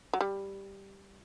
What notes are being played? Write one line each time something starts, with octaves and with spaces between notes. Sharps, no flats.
F#3
G3